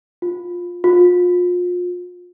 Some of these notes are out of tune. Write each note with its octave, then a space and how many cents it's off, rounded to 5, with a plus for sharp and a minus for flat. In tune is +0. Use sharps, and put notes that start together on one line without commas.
F4 +15
F4 +35